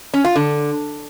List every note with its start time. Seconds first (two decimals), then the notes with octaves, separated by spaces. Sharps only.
0.14 C#4
0.25 F4
0.36 D3